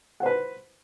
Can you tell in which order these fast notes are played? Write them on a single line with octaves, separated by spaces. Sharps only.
F#5 C5 B4